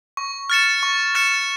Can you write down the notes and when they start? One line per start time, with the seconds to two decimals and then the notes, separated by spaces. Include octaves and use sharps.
0.17 C#6
0.50 F6 A6 C#7 E7
0.83 C#6
1.15 F6 A6 C#7 E7